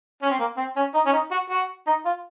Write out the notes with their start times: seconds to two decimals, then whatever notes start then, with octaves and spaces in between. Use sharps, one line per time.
0.22 C#4
0.30 C4
0.39 A#3
0.57 C4
0.76 C#4
0.94 D#4
1.06 C#4
1.13 D#4
1.31 F#4
1.50 F#4
1.87 D#4
2.05 F4